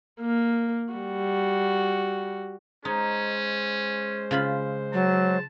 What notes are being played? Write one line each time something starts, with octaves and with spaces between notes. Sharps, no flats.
A#3
G3 F#4
G#3 C#4 D#4 C5
C#3 F4 B5
F#3 A5